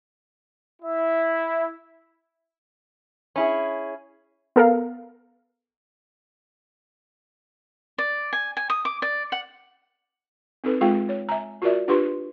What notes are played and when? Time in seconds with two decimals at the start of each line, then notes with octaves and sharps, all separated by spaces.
0.82 E4 E5
3.36 C#4 E4 G#4
4.56 B3 A4 A#4 F5
7.98 D5
8.33 G#5
8.57 G#5
8.70 D#6
8.85 D6
9.02 D5
9.32 F#5
10.64 C4 D#4 A4 B4
10.81 G#3 C4 F4 G#4 F5 G5
11.09 C#5
11.29 E5 G#5 A#5
11.62 F4 F#4 A#4 D5 E5
11.88 D4 F4 G4 B4 C6 C#6